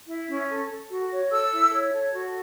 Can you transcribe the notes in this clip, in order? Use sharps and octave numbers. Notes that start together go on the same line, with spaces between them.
E4
C#4
A4
A4
F#4
C#5
A4 E6
E4
C#5
A4
F#4